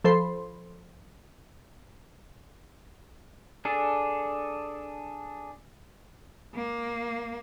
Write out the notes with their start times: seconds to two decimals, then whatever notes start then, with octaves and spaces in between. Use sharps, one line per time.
0.04 F3 A4 C5 B5 C6
3.65 D4 G#4 A4
6.54 A#3